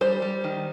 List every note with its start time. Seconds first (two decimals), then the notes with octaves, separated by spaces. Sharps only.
0.01 G3 C5
0.22 G3
0.44 D#3